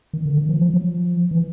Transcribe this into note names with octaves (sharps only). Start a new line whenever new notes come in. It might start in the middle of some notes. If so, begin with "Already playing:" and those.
D#3
D3
D#3
F3
F3
F#3
F3
E3